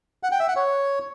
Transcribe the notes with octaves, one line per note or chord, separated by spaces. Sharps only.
F#5
G5
E5
F#5
C#5